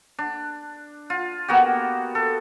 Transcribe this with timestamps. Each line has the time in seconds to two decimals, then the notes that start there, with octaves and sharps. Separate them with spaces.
0.19 D4
1.10 F4
1.48 A#3 B3 F#4 G4
2.15 A4